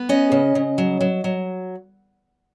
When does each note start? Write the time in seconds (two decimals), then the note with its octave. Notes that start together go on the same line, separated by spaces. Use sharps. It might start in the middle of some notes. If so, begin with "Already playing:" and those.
Already playing: B3
0.09 C#4 D#5
0.32 C#3
0.55 C#3
0.78 F#3
1.01 F#3
1.24 F#3